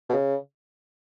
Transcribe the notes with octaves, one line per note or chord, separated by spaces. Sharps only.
B2
C#3